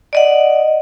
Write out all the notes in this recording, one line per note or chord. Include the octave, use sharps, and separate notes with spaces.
D5 D#5 F#5